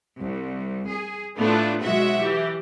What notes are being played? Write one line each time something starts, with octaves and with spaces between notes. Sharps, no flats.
C2
G#4
A2 A3 B3 D4 E4 F4
B1 G#3 F#4 E5 F#5
E3 G4